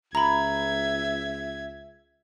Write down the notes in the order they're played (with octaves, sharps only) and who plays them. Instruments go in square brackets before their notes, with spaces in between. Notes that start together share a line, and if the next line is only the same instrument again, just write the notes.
[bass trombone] C#2 [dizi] E5 [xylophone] A#5 B5 [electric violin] G#6